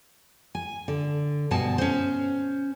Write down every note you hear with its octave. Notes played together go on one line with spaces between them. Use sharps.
G#5
D3
D2 G2 B2 G#5 A5
C#4 C5